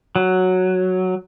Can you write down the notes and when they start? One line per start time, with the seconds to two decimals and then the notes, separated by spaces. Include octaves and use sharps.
0.16 F#3